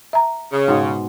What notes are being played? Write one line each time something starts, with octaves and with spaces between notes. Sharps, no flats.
E5 A#5
C#3
G#2 B2 G#3